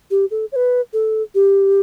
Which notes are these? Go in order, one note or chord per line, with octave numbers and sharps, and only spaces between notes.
G4
A4
C#5
B4
A4
G4